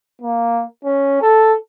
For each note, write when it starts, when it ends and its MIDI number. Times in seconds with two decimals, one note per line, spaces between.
0.22 0.64 58
0.85 1.18 61
1.22 1.54 69